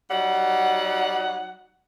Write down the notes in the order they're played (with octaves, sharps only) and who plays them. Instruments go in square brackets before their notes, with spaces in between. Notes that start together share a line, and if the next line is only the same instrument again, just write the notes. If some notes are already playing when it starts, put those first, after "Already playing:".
[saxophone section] F#3 G3 D#4 F#5